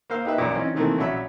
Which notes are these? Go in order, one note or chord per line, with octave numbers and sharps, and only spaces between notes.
A#3 C5 F5 E6
A#3 D#4 G4 B4 E5
A#1 F#2 A#2
E3 C4 C#4 D#4
C3 D#3 E3 A3 A#3 C4
A#1 F#3 C#4 E5 B5